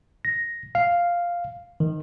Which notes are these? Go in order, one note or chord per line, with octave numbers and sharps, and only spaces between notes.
A#6
F5
D#3